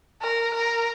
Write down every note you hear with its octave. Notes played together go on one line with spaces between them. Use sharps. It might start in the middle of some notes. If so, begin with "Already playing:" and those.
A#4
A#4